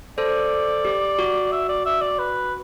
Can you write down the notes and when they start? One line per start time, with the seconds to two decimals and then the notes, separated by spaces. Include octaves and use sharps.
0.18 A4 C5 D5
0.85 G4
1.19 F#4
1.52 E5
1.69 D5
1.85 E5
2.01 D5
2.19 B4